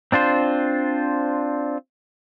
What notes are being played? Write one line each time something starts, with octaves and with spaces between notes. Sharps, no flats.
C4 D4 F4 C5